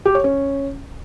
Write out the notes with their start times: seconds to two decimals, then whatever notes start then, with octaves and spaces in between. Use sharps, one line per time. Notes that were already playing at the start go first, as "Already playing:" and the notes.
0.05 G4
0.15 C#5
0.24 C#4